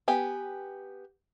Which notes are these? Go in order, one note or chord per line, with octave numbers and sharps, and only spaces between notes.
B3 G4 G5 G#5